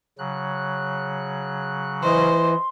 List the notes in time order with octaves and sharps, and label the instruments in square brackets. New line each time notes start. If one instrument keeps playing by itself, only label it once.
[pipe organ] C#3 F#3 F#6
[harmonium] E3 [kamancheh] C5 D#5 [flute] C6